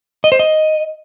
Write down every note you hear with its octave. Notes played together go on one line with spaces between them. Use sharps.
D#5
C5
D#5